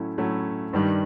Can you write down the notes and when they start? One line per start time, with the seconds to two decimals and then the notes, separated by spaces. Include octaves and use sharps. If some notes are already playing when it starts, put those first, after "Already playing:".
Already playing: A2 F#3 A3 C#4 E4
0.18 A2 F#3 A3 C#4 E4
0.73 G2 D#3 G3